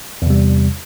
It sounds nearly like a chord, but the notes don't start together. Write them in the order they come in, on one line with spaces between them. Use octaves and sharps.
E2 C3 G3